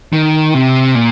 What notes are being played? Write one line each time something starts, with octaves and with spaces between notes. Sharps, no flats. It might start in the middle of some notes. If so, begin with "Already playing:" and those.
D#3
C3
A#2